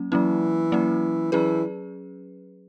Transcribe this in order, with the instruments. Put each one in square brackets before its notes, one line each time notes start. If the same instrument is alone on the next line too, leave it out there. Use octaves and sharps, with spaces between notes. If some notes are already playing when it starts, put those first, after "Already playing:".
Already playing: [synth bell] F#3 A#3 C#4
[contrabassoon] E3 [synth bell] F#3 A#3 C#4
[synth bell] F#3 A#3 C#4
[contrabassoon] E3 [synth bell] F#3 C#4 G#4 B4